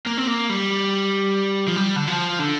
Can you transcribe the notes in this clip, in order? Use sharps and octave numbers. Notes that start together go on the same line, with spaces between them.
A#3
C4
A#3
G3
F3
G3
D3
F3
D3